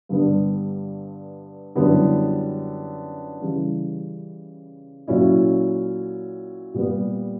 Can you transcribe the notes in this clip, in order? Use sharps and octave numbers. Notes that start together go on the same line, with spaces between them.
G2 D3 G3 B3
F#2 D3 G3 B3 E4
C#3 E3 G3
A#2 F#3 C#4 E4
A#2 G3 B3